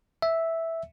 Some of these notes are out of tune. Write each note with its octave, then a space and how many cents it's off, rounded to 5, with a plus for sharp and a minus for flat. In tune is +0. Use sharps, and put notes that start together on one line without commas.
E5 -5